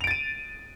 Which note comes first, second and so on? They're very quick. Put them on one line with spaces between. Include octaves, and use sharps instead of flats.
F7 D7 A6 D#7